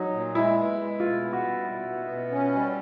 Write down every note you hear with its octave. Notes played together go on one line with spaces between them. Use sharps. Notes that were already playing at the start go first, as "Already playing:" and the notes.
Already playing: F#3 D#4
A#2
G#3 E4
B3
G#3
B2 F4
B3
F#4
G3
B2
B3
B2
C#4
G3